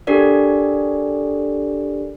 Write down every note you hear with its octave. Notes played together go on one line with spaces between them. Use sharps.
D4 G4 A4 A#4 D5